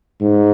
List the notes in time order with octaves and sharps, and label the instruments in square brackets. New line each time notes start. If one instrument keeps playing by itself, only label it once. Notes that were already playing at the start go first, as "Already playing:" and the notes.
[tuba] G#2